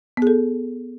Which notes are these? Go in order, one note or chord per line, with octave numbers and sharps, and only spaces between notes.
B3 G#4 A4